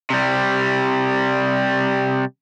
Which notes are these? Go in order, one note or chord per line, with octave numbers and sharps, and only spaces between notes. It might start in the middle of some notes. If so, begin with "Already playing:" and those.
C3 G3